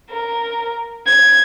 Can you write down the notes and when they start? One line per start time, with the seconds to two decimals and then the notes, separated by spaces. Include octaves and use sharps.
0.11 A#4
1.06 G#6